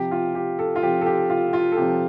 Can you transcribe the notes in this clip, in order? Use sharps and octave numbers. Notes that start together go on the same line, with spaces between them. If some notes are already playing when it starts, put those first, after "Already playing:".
Already playing: C3 F3 G4
F4
G4
A4
F4
C3 F3 G4
A4
G4
F4
F4
A4
C3 F3 G4